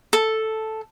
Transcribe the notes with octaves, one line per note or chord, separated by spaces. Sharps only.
A4